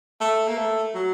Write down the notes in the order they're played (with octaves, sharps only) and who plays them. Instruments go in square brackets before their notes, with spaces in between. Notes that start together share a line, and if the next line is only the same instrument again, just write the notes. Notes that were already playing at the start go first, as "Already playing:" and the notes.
[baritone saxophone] A3
A#3
A3
F#3